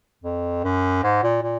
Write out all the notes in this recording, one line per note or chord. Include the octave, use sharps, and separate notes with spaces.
F2
F#2
G#2
A#2
A#2